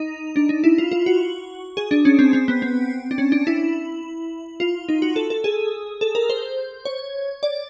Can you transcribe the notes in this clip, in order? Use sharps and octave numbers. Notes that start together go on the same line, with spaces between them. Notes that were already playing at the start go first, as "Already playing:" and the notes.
Already playing: D#4
D4
D#4
E4
F4
F4
F#4
G#4
D4
C#4
C4
C4
B3
C4
D4
C#4
D4
E4
F4
D#4
F#4
A4
A4
G#4
A4
A#4
C5
C#5
D5